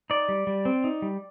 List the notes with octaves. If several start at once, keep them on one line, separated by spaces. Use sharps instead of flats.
D#4 D5
G3
G3
C4
D#4
G3